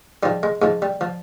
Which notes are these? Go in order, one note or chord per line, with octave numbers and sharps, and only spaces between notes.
G#2 F3 G3
G#3
G#2 F3 G#3
G3
F3